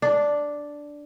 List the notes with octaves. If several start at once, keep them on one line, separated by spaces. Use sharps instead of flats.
D4